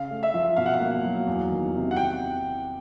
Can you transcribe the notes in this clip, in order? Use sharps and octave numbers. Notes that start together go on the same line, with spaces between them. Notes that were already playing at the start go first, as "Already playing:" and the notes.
Already playing: C#3 F5
A3
E5
F3
B2 F5
F#5
F5
A#3
F#3
E2
D#3
C3
F#5
G5